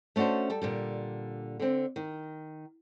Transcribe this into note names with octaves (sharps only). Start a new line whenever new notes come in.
A3 C#4 D4 F#4 C5
G3 A4
A#2 D3 G3
D3 C4
D#3